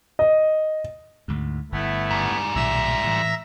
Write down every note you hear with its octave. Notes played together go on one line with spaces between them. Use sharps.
D#5
D2 G#2
G1 A3 B3 E4
G#2 G3
B1 A#2 D#3 E5 A#5 E6
A2 E3